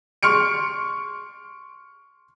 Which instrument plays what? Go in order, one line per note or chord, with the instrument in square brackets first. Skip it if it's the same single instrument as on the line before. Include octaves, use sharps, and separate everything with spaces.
[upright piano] C6 C#6 F6 C#7 D7